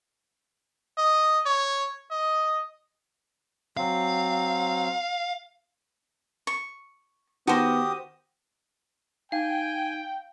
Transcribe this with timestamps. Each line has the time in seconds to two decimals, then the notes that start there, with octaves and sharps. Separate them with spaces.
0.98 D#5
1.46 C#5
2.11 D#5
3.77 F#3 C4 F5
6.47 C#6
7.47 D#3 B3 F#4 G4 C5 A5 D#6 A#6
9.32 D#4 F5 G5 G#5